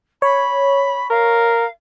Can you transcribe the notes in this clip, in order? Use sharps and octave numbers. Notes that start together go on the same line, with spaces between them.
C#5 B5
A#4 F5